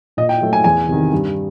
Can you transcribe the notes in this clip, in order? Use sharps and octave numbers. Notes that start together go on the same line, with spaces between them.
A#2 D#5
G5
F#3 A3
G#5
E2 G#5
C3 D#3
G2